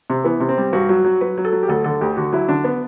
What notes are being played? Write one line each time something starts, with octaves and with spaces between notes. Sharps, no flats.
C3
E3 B3
C3
C4
G3
G2 F#4
F#3
F#3
F#3 B4
F#3
A4
F#3
G4
D2 A4
D3 A4
D2 G4
D3 F#4
F#3 E4
D3 D4
B3